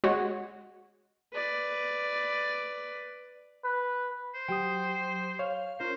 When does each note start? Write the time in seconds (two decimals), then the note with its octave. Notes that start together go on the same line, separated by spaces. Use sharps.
0.04 G#3 F#4 C#5 F#5
1.34 B4 D5
3.64 B4
4.35 C5
4.48 F#3 G4 G5 D#6
5.39 C#5 F5
5.80 C#4 F4 A#4 C5